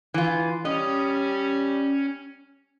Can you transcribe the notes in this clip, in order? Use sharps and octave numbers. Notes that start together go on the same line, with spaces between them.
E3 F4
G3 C#4 D#5